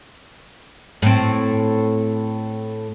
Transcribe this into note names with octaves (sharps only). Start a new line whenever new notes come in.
A2 C4